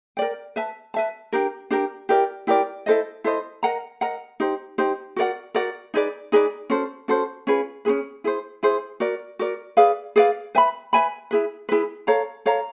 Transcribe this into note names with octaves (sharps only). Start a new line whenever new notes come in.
A#4 D5 G5
B4 E5 A5
B4 E5 A5
D4 G4 A#4
D4 G4 A#4
E4 G4 A#4 D5
E4 G4 A#4 D5
E4 A4 C5 D#5
E4 A4 C5 D#5
A#4 D#5 F#5 A#5
A#4 D#5 F#5 A#5
D#4 G4 C5
D#4 G4 C5
F#4 A#4 D5 F#5
F#4 A#4 D5 F#5
D#4 G#4 B4 D5
D#4 G#4 B4 D5
C#4 F#4 A4 C5
C#4 F#4 A4 C5
C#4 F4 G#4 B4
C#4 F4 G#4 B4
E4 G#4 C5
E4 G#4 C5
F#4 A#4 D5
F#4 A#4 D5
G#4 B4 D5 F5
G#4 B4 D5 F5
B4 E5 G#5 B5
B4 E5 G#5 B5
E4 G#4 B4
E4 G#4 B4
A4 C#5 F5 A#5
A4 C#5 F5 A#5